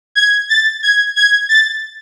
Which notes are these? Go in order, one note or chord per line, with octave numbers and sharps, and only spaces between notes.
G#6
A6
G#6
G#6
A6